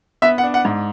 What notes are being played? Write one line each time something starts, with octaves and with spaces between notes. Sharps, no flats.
B3 E5
F#5
D4
F#5
G#2